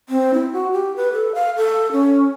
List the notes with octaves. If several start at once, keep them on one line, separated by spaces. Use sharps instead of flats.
C4
E4
F#4
G4
B4
A4
F5
A4
C#4